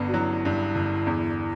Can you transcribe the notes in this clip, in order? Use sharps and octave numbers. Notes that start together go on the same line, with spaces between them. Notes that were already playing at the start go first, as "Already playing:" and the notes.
Already playing: G1 G2 B3
F#4
F#3 E4
G2
G1
E2